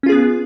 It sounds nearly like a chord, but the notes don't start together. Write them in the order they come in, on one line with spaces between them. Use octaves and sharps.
C#4 F4 G#4 B3